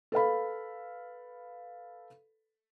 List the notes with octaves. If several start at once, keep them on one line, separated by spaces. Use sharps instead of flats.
A4 B4 F5 B5